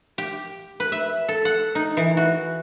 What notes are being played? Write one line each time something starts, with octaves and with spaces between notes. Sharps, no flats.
G4
B4
E5
A4
F#5
D#4
E3
F#4